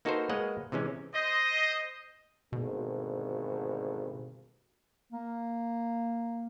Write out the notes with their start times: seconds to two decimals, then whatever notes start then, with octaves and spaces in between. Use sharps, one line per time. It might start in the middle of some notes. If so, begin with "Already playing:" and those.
0.05 A#3 D#4 F#4 A4 B4 C5
0.29 G#3 A#3 B4 C#5 D#5 F#5
0.72 C3 E3 G#3 C#4
1.14 C5 D#5
2.53 G#1 D2 G2 B2
5.12 A#3